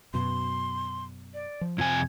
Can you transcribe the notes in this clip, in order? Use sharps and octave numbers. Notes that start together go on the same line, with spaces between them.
F#2 B2 C6
D5
F3
F2 C3 G#5 G#6